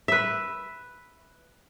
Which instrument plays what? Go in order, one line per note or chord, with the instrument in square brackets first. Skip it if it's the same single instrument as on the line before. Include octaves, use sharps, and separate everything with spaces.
[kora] B4 E5